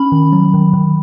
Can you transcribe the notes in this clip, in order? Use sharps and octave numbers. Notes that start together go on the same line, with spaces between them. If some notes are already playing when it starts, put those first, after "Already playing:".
Already playing: C#4 B5
D#3
F#3
D#3
D#3